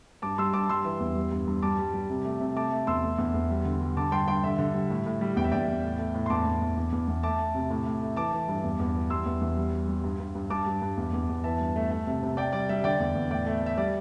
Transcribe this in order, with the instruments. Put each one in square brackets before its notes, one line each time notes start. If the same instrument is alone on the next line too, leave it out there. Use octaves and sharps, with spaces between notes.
[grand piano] G2 A5 D6
G3 C6 E6
G2 A5 D6
G3 C6 E6
E3
E2
G3
G2
G2
G3 A5 D6
G3
G3
C3
A3
C3
A3 A5 D6
A3
E2 C6 E6
A3
E2
E2
G3
D3
G3
D3 A5 D6
G2 G5 C6
G2 G5 C6
D3 E5
D3
G3
A2
A2
G3
E2 G5
E5
E2 D5 G5
E2
A2
A3
A2
C6
E2 A5 D6
E2
E2
E2
E2
E2
A3 A5 D6
A3
C3
A2
A2
A3
E3 A5 D6
E3
G2
E2
E2
E3
G3 C6 E6
E2
E2
G3
G3
G3
G2
G2
G2
G2 A5 D6
G2
G2
E2
E2
E2
E3 E5 A5
G2
A3
A3
C3
C3
C3 D5 G5
G3 D5
G3 E5
D3 D5 G5
E2
E2
A2 D5 G5
A3
A3 E5
G3 D5